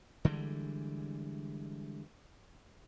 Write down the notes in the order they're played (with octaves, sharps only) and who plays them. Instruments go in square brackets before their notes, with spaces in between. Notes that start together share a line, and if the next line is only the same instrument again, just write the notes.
[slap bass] D3 E3 G3 G#3